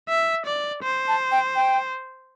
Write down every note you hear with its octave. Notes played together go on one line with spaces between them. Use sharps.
E5
D5
C5
A5
G5
G5